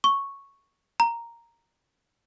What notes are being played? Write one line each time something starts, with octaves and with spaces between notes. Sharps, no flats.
C#6
A#5